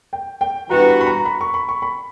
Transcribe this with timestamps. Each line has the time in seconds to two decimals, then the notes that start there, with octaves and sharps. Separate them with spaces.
0.13 G5
0.41 G5
0.70 G2 E3 B3 F#4 A#5
0.88 B5
1.01 B5
1.06 A#5
1.26 B5
1.41 C#6
1.54 B5
1.69 C#6
1.82 B5